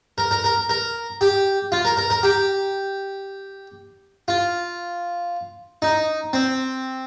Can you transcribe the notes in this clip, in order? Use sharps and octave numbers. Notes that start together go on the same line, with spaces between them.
A#4
A#4
A#4
A#4
G4
F4
A#4
A#4
A#4
G4
F4
D#4
C4